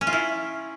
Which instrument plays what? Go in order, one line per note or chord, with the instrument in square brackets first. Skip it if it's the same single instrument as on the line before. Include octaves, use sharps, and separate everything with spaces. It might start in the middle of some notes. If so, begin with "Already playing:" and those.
[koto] C#4
F4
E4